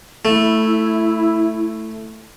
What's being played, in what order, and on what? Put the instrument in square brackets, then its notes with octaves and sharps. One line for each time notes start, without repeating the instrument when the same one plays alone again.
[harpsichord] A3 [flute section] E4